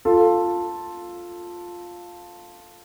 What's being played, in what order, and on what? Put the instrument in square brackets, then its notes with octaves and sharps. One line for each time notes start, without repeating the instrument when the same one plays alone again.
[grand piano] F4 A4